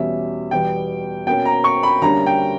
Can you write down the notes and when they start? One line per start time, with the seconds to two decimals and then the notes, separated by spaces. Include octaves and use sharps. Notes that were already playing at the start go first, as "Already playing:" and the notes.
Already playing: E2 B2 G3 C#4 E5
0.51 E2 B2 G3 B3 G5
1.26 B2 A#3 C#4 G5
1.45 A#5
1.64 C#6
1.83 B5
2.02 D2 D3 G3 A#3 C#4 A#5
2.26 G5